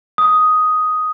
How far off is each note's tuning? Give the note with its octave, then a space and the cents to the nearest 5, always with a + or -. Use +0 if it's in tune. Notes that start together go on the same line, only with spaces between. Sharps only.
D#6 +5